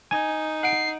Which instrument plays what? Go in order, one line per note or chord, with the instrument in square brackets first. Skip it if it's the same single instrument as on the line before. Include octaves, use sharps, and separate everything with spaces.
[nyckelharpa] D#4 [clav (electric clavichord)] G#5
[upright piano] F#5 D7 [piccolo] C7